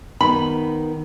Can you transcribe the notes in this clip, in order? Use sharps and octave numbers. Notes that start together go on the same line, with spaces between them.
D#3 B3 B5